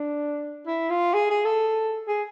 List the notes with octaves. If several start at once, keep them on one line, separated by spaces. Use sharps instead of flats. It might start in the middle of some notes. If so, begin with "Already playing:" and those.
Already playing: D4
E4
F4
G#4
G#4
A4
G#4